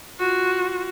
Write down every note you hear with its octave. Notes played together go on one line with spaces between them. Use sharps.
F4 F#4